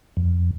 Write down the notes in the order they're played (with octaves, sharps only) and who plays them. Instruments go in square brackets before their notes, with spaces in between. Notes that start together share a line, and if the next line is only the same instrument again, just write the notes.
[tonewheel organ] F2